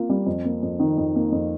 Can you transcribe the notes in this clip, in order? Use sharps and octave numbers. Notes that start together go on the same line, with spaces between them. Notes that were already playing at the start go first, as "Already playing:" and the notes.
Already playing: A#3 F4
G3
F2
A#3
F2
D#3
F2
A#3
F2